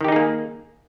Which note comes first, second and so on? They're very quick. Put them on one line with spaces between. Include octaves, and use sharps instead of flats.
D#3 G4 D#4 G#4 A#3